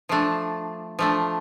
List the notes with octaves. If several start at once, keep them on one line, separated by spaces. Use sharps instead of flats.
F3 A3 D4
F3 A3 D4